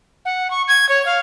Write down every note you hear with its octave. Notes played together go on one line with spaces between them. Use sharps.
F#5
C#6
G#6
C#5
F5